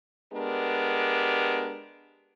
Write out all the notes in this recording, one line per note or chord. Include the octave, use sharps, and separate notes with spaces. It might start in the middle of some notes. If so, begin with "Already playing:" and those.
G#3 B3 D4 G4 A#4